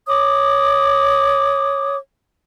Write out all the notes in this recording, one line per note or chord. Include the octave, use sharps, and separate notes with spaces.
C#5 D6 D#6